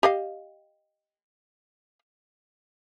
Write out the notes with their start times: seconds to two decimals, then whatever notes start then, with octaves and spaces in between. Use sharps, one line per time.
0.03 G4 D#5 F5